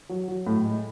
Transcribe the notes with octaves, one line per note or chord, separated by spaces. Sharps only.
F#3
F#3
A2
G#3